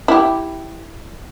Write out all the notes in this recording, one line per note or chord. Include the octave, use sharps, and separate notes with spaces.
E4 G4